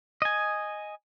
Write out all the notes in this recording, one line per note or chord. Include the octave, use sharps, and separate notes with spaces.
D#5 G#5